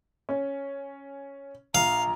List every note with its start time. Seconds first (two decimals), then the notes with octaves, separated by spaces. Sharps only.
0.29 C#4
1.75 A#1 F5 A#5